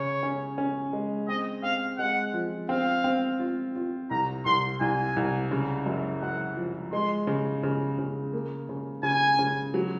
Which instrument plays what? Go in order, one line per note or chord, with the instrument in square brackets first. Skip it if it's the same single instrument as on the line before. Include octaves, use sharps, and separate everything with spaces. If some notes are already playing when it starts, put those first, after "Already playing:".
Already playing: [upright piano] C#3 [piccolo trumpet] C#5
[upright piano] C#4
C#4
G#3
[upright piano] C4 [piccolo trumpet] D#5
[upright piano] C4 [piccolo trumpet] F5
[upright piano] G#3 [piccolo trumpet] F#5
[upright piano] F3
[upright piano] C4 [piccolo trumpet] F5
[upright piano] C4
F4
F4
[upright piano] C2 [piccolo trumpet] A#5
[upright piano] C2 [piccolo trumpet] C6
[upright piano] C2 [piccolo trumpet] G#5
[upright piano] C2
C#3
F#2
[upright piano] F#2 [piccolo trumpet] F#5
[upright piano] F3
[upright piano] G#3 [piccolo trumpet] C6
[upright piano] C#3
C#3
C#3
A#3
C#3
[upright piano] C#3 [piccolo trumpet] G#5
[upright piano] C#3
F#3